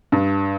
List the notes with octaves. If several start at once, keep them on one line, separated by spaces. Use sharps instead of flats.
G2